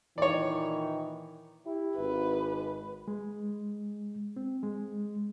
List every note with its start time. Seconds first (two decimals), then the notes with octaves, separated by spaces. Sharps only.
0.18 A#2 D#3 E3 C#5 D5
1.65 E4 G4
1.97 G#1 B4
3.08 G#3
4.36 C4
4.63 G#3